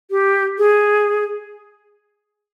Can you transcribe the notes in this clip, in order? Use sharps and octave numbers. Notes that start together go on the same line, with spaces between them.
G4
G#4